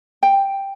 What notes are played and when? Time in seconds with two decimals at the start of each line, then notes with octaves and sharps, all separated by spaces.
0.23 G5